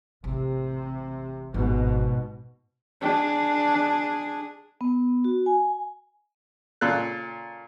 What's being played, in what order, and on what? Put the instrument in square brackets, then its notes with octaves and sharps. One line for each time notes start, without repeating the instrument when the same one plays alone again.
[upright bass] A1 [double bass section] C3
[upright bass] G#1 [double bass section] G#2 B2
[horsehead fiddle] D4 G#4
[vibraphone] B3
F#4
G#5
[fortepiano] A#2 C#3 A4 F#6